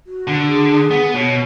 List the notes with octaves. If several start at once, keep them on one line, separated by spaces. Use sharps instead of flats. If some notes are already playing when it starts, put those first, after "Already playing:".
F#4
D3
G#4
B3
B2 C#5